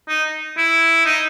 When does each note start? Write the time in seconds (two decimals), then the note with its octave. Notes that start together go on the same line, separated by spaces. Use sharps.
0.09 D#4
0.58 E4
1.05 D#4